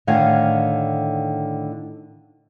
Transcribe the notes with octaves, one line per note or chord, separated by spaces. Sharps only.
A2 D3 D#3 F5 F#5 G#5